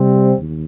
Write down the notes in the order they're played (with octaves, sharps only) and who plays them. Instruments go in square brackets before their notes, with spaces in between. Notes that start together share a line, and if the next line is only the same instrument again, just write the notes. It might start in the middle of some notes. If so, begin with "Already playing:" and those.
Already playing: [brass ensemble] C3 G3 C4
D#2